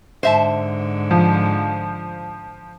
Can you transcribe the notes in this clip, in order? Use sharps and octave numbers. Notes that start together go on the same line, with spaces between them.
G#2 D3 C5 E5 A5
F3